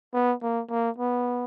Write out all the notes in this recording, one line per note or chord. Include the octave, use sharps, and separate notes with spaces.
B3
A#3
A#3
B3